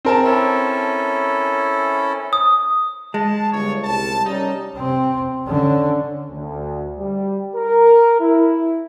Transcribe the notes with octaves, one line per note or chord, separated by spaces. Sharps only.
C4 A#4 A5
C#4 E4 A4
D#6
G#3 A5
G1 C#5
C2 A5
G3 C#4 D#4
C3 C4
D3 C#4
D2
G3
A#4
E4